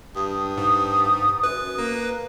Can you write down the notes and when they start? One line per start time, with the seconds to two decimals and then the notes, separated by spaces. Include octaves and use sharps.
0.16 G2 D#6
0.58 G#2
1.43 F#2 B4
1.78 A#3